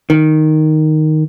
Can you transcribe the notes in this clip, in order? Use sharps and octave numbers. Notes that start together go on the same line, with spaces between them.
D#3